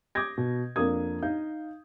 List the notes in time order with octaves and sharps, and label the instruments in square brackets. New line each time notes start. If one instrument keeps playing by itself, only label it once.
[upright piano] D6 D#6 G6 G#6 A#6
B2
F2 A#3 D4 A#4 D#6 G#6
D#4 F5 G6